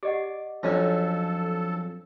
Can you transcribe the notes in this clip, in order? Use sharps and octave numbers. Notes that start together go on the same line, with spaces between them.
G4 D5 D#5 F#5 D6
F2 F3 F#3 C#4 D4 A4 A#5